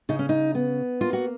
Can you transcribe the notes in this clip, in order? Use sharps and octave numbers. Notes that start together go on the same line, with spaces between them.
C#3 D#4
C#4
D#4
B3
A#3 F4
F#4